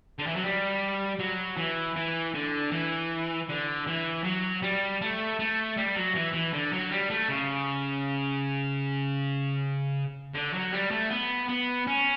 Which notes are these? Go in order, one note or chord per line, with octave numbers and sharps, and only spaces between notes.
D3
E3
F#3
G3
F#3
E3
E3
D3
E3
D3
E3
F#3
G3
A3
A3
G3
F#3
E3
E3
D3
F#3
G3
A3
C#3
D3
F#3
G3
A3
B3
B3
C#4